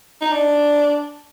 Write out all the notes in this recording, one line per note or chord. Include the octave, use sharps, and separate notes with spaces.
D#4
D4